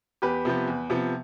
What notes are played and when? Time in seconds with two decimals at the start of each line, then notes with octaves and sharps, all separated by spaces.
0.22 E2 G4 B4
0.45 C3 F3 B3
0.67 E2
0.90 C3 F3 B3